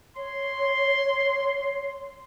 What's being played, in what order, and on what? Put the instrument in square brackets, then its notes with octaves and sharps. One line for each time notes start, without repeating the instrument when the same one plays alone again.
[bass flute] C#5 [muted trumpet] C6